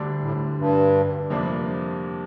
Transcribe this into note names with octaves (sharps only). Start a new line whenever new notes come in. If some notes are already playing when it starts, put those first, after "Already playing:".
Already playing: D2 D3 G3 D4
A2
G2
F2 C3 G3 A#3 D4